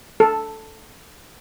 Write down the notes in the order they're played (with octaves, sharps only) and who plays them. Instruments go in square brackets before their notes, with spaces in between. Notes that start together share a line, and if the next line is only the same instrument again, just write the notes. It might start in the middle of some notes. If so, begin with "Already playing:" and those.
[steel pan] A4